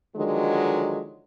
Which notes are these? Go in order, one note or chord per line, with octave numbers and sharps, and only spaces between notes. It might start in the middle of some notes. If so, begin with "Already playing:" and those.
D3 D#3 F3 F#3 G#3